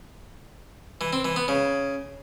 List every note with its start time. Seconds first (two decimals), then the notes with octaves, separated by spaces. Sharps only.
1.01 E3
1.13 C4
1.25 E3
1.36 B3
1.48 C#3